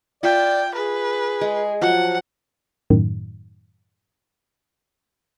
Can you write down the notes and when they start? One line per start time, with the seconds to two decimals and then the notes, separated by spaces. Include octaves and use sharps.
0.23 F4 D5 E5 G5
0.75 G#4 B4
1.41 G#3
1.81 F3 F#3 F#5
2.90 F#2 A2 D#3